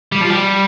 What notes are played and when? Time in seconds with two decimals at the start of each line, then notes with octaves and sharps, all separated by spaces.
0.12 G3
0.21 F3
0.30 G3